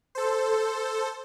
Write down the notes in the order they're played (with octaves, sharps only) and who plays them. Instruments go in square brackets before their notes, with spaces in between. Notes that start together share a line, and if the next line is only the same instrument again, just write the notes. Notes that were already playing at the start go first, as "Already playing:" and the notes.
[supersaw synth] A4 C5